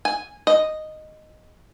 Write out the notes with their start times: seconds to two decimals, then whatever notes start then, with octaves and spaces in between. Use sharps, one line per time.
0.05 G#5
0.47 D#5